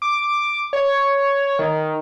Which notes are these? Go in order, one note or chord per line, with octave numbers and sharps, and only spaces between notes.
D6
C#5
D#3